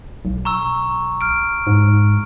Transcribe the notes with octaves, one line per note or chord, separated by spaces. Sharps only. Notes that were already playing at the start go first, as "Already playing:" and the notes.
B1
A#5 C#6 E6
F6 D7
G#2